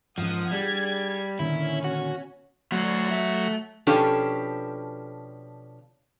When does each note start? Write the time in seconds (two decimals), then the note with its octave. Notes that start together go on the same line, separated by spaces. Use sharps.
0.18 G#2 F3 A#3 C#4 F#5 D#6
0.51 G3 D4 G#4 G#6
1.39 A#2 D3 D#3 C#4 E4 C#5
1.84 F#4
2.72 F#3 A3 F#4
3.10 A3 E5
3.87 B2 F3 C#4 D4 G4 A4